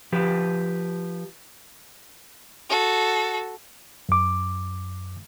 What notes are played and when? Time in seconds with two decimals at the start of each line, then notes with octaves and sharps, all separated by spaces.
0.12 F3 G4 B4
2.70 F#4 A4
4.09 F#2 D6